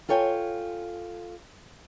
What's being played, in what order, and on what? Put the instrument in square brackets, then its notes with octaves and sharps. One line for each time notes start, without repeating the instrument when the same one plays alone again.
[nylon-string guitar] F4 A4 C#5 G5 G#5